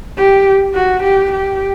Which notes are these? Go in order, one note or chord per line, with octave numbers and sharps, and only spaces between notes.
G4
F#4
G4
G4